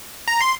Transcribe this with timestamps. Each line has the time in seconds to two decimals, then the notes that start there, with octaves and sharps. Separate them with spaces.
0.28 A#5
0.41 C6